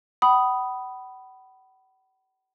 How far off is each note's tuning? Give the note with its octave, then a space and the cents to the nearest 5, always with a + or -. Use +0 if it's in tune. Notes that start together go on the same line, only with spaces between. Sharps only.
F#5 +45 B5 +0 D#6 +0